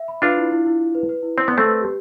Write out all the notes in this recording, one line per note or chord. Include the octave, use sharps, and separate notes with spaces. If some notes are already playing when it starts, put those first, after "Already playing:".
Already playing: E5
B5
D4 F4 B4
E4
E4
E4
E4
B4
B4
E4
C4 D5
B3 D5
A3 C4
B4
G4